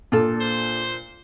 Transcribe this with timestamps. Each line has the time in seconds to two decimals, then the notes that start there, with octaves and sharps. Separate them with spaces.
0.12 A#2 D4 F4 A4
0.41 C5